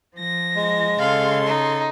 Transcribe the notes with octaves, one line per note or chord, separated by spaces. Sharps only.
F3 A#6
G#3
C#3 A4 F5 C6
D#4